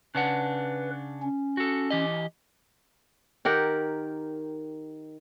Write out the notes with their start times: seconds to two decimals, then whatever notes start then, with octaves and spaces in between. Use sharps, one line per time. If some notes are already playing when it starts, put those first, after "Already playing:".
0.15 C#3 D4 B4 F#5
1.22 C#4
1.57 F#4 A4
1.90 E3 G4 D#5
3.45 D#3 G4 A#4 F#5